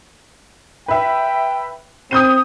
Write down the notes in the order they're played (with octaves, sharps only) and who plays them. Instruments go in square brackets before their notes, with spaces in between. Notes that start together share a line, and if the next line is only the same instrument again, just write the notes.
[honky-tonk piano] B4 E5 [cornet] G5
[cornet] C4 [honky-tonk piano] D#6 G6 D#7